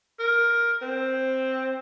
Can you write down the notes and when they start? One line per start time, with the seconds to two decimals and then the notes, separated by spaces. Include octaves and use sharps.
0.19 A#4
0.82 C4